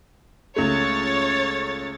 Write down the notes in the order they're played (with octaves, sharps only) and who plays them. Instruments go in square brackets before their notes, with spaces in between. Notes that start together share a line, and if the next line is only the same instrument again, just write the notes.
[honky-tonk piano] C#2 A3 [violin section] C#5 A6